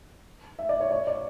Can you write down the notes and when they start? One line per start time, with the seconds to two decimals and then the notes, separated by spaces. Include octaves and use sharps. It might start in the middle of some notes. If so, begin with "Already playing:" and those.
0.59 E5
0.69 D5
0.80 C#5
0.91 C#5
1.07 D5